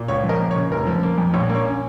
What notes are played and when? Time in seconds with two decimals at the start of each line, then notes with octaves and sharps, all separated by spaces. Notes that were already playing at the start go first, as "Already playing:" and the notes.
Already playing: A#2
0.08 C#2 C#5
0.23 F3
0.29 A#4 D#5
0.40 A#3
0.51 C#5
0.56 C#3
0.71 F1 A#4
0.87 F3
1.03 A#3
1.18 F2
1.34 A#1 C#5
1.49 A#3
1.55 C#5
1.65 C#4